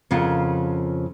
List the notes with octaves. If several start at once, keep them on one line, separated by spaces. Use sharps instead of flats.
F2 C#3 F4 A#4 F#5